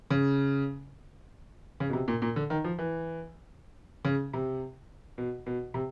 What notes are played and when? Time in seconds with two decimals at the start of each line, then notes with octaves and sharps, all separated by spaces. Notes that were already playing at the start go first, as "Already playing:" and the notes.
0.10 C#3
1.80 C#3
1.89 B2
1.93 C3
2.08 A#2
2.22 A#2
2.36 D3
2.50 D#3
2.64 F3
2.79 E3
4.05 C#3
4.33 C3
5.18 B2
5.46 B2
5.74 C3